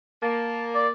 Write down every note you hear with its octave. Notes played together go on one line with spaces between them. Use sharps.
A#3 A5
D5